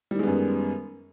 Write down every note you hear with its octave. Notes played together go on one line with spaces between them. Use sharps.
F#2 D#3 G3 G#3 B3